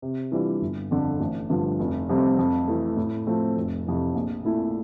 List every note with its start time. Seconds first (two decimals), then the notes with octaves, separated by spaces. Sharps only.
0.02 C3
0.32 E3 G3 D4 F4
0.61 G1
0.91 F2 D3
1.20 A1
1.49 G2 D3 F3
1.79 F1
2.09 F2 C3 G3 C4
2.39 F2
2.68 E3 A3
2.97 A2
3.27 F3 A3 C4 F4
3.56 F1
3.86 F2 C3 E3
4.15 A#1
4.45 A#2 A3 E4